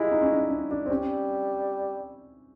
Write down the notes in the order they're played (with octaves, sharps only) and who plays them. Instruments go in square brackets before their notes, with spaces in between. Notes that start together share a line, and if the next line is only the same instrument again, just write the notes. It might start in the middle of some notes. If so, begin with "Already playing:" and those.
Already playing: [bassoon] G#3 [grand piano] E4 F4 G4
[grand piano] D#4
C#4
D4
D4
D4
C4
[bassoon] G3 [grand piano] C#4